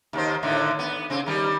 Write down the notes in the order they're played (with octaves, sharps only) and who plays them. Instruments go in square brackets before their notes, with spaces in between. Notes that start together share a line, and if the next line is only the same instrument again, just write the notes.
[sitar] D#2 D#3 C5
A2 D3 D#3
B3
C#3 C4
D#3 G3